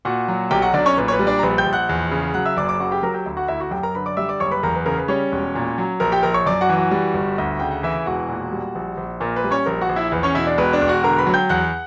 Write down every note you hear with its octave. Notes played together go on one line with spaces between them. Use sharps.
A#2 F#4 F#5
F#3
B1 G4 G5
F#4 F#5
B1 D4 D5
C#4 C#5
A#2 B4
C#5
B4
G3
D4 D5
A#5
A#1 B4 B5
G5 G6
A#1
F#5 F#6
E2
C#3
F#3 F#5 F#6
E5 E6
F#1 D5 D6
D5 D6
C#3 F#4 F#5
G4 G5
F#3 A#4 A#5
G4 G5
D2
F#4 F#5
D2 E4 E5
F#4 F#5
F#2 G4 G5
A#4 A#5
D3 B4 B5
D5 D6
G3 E5 E6
D5 D6
F#1 C#5 C#6
B4 B5
E2 A#4 A#5
B4
C#3 A#4
B4
G3 C#4 C#5
E1
A#2
F#3
A#1 A#4
G4 G5
A#1 A#4 A#5
C#5 C#6
F#2 D5 D6
F#4 F#5
E3
F#4 F#5
G3
G1
D2
C#3 G5
F#5
E3 E4 E5
E1 F#4 F#5
A#2
G3
A#1
A#1
A#2 A#4
B4
G3
C#4 C#5
A#1 A#4
F#4 F#5
A#1
E4 E5
E2 B4
C#4 C#5
B2 E4 E5
D4 D5
E1 B4
D4 D5
E1
F#4 F#5
D3 A#4 A#5
B4 B5
F#3
G5 G6
E2 F#5 F#6